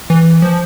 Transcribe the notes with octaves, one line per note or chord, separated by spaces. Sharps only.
E3
F3